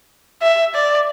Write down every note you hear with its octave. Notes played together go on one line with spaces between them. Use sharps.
E5
D5